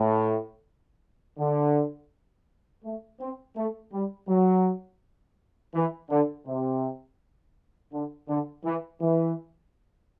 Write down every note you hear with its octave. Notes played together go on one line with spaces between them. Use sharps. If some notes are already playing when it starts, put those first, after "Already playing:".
Already playing: A2
D3
A3
C4
A3
G3
F#3
E3
D3
C3
D3
D3
E3
E3